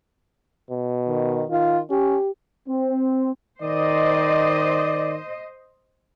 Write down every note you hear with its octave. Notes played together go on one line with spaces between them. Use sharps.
B2
D#3
D#3 F4
C#4 G4
C4
D#3 C5 D5 D#5